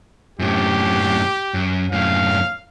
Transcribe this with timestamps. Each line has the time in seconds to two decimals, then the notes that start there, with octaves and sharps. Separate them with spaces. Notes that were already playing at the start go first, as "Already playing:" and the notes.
0.39 F#2 A2 G4
1.54 F#2
1.92 F#2 A2 F5